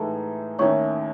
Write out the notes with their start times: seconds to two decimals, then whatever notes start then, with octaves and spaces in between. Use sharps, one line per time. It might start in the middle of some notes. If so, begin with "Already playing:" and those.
Already playing: A2 E3 G#3 D#4 A4 A5
0.59 D#2 D#3 A3 C#4 E4 C#5 C#6